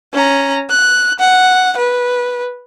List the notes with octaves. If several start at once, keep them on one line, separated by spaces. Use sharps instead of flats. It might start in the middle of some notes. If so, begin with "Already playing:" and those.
C#4 A#5
F#6
F#5
B4